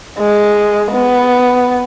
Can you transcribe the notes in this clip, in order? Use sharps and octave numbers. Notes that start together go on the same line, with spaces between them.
G#3
B3